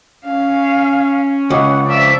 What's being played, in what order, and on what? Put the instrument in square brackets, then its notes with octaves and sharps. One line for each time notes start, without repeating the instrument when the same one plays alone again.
[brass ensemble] C#4 [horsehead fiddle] F5
[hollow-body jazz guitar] C#2 [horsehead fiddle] F#5
[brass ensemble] C3 F3 [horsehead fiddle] D5 E5